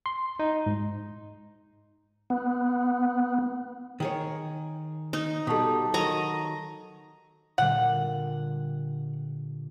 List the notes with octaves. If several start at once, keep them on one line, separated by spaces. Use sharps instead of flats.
C6
D#4
G#2
B3
D#3 G#4 C#5
D#4
B2 G3 A4 A5 D#6
D#3 F#3 D#5 A#5
A#2 D3 G3 F#5